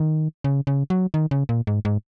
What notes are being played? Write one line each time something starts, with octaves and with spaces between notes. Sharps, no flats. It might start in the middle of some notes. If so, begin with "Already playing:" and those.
Already playing: D#3
C#3
C#3
F#3
D#3
C#3
A#2
G#2
G#2